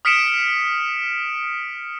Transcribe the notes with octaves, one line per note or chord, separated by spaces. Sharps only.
D#6 F6 B6 C#7 D7 E7